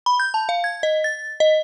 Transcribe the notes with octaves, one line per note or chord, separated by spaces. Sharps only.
B5
G6
A5
F5
G#6
D#5
A6
D#5